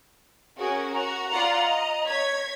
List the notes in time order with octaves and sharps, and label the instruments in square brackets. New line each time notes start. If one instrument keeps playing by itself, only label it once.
[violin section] C#4 F#4 A#4 [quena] G#4
[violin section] F#4 [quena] A#5
[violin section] F4 D5 F#5
D#5
C#5 G#6 B6